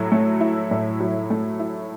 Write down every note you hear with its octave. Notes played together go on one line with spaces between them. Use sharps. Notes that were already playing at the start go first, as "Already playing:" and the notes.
Already playing: A2 F#3 E4
A3
E4
A2
F#3
A3
E4